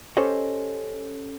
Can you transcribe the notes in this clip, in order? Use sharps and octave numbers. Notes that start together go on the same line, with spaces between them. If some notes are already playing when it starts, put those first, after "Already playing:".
C#4 G4 A4 C5 C#5 D#5